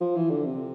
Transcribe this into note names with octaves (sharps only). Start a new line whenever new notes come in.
F3
E3
D3
C3